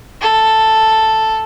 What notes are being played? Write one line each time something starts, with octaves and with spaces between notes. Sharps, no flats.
A4